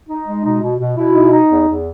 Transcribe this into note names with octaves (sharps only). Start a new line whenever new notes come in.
D#4
G#3
B2 D#4
B2
B2
B2 E4
D#4
D#4
E2
E2